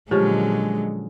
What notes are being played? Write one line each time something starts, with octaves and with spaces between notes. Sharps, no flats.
A#2 D3 F3 F#3 G#3 C#4 G4